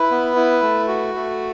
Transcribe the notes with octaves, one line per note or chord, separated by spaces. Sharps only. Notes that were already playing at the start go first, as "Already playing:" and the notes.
Already playing: E4 B4
B3
E4
A3
F#4
A3